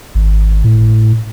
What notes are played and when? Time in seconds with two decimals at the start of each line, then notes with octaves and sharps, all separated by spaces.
0.15 G#1
0.64 A2